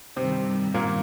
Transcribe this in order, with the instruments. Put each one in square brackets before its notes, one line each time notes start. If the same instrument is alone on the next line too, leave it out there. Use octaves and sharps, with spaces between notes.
[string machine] G2 D#3 G3 [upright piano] C3 C4
[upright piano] A#2 A#3